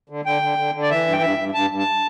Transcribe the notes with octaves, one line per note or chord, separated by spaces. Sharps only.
D3
D3 G5
D3
D3
D3
D5
E3 E5
G2
G5
G2 E5
G2
G2 A5
G2
A5